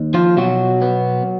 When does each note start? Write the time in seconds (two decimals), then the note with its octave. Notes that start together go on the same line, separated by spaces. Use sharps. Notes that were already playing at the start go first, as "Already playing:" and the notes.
Already playing: D#2
0.14 F3 F4
0.37 B2 F#3 F#4
0.82 B3